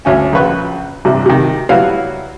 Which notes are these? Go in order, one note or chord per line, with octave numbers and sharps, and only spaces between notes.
D2 C#4 G#5
A#1 C#3 F4 B4 C#6
A1 G2 C3
C3 D#3
F#3 G3 E4 F#4 B4 F5